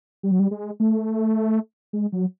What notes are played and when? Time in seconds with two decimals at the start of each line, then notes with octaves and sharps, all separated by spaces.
0.23 G3
0.31 F#3
0.40 G3
0.51 G#3
0.80 A3
1.93 G#3
2.13 F#3